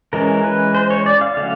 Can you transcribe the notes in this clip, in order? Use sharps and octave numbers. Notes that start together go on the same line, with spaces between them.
E3 G#3 C#4 A#4
B4
C5
C#5
D5
F5
D3 F#3 A3 C#4 F5